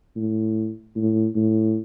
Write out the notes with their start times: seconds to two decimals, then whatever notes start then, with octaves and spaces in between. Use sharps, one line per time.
0.16 A2
0.96 A2
1.35 A2